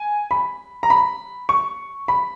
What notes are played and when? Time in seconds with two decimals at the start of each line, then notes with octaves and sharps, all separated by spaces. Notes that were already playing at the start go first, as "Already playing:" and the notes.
Already playing: G#5
0.31 B5
0.83 A#5
0.90 B5
1.49 C#6
2.08 B5